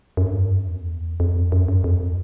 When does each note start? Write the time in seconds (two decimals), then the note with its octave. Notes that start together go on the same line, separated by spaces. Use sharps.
0.17 F#2
0.23 G2
0.39 F#2
0.55 F2
0.71 E2
1.20 F2
1.52 F#2
1.68 F#2
1.84 F2